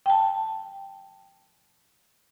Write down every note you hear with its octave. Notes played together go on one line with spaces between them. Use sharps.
G5 A5